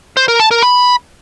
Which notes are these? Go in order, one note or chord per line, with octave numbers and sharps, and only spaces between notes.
C5
A#4
A5
A#4
B5